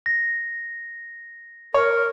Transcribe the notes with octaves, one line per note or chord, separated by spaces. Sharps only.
A#6
A#4 C#5